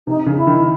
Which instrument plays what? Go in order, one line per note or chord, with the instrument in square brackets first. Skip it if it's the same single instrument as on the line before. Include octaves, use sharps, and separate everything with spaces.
[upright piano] C3 [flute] D#4
[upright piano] C#3
[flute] E4
[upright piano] D#3